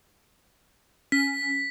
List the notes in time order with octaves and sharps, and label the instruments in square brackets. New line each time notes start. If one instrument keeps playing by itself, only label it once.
[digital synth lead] C#4 [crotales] B6